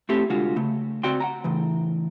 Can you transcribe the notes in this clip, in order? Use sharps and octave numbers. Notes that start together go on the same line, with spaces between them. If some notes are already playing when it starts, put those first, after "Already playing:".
A3 C4 E4 G4 A4
C2 D3 G#3 F4 F#4
C#3 A3
C#2 C4 F#4 D5 G5 C6
F#5 G5 A#5
A2 C#3 E3